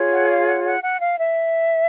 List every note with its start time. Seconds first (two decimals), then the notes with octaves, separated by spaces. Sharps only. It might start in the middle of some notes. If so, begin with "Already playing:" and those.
Already playing: F4 G#4 C#5
0.11 F#5
0.28 F5
0.47 F#5
0.64 F#5
0.82 F#5
1.00 F5
1.17 E5